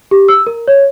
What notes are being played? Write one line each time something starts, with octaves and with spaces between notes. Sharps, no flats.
G4
E6
A#4
C#5